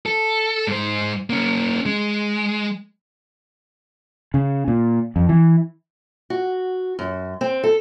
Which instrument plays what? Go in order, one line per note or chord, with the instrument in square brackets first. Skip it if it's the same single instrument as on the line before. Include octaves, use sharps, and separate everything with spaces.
[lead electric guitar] A4
G#2 C5
A#3 C#4
G#3
[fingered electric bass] C#3
A#2
F2
E3
[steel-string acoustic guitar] F#4
F#2
C4
A4